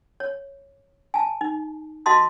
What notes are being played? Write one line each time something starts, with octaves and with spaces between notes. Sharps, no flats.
C#5
G#5 A5
D#4
F#4 D#5 F5 A5 C6 D#6